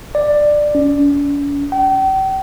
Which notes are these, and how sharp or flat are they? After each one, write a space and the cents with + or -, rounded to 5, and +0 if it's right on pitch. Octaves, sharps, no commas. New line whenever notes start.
D5 +10
C#4 +45
G5 -40